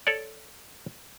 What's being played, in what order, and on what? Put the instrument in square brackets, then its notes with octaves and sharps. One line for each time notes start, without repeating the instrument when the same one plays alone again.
[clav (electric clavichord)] A4 C#5 D5